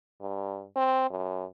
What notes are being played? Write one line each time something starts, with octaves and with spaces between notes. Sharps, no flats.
G2
C4
F#2